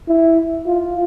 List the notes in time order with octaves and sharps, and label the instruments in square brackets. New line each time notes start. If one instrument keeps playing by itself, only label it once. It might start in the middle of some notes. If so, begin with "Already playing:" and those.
[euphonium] E4
F4